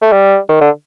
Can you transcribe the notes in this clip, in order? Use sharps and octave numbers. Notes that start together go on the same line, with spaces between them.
A3
G3
D#3
D3